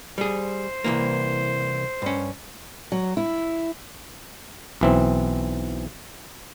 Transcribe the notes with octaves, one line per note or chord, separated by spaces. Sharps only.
G3 G#4 C5
C2 E3 A#3
G2 C#4
F#3
E4
B1 E3 C4